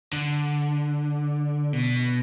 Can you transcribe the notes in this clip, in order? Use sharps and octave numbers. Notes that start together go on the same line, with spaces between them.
D3
B2